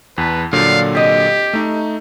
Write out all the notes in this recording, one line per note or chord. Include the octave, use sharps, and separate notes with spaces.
E2 B4 A5
A#2 D3 F#3 G3 F5
C3 G4 D#5
A3 D#4